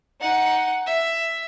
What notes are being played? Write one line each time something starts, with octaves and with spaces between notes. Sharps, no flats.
D#4 F#5
E5